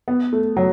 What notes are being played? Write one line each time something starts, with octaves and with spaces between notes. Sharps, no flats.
B3
A3
F#3